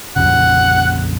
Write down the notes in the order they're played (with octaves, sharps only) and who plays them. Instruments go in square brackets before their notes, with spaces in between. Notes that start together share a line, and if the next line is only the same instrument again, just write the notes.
[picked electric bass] A#1 F2 C#3 [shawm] F#5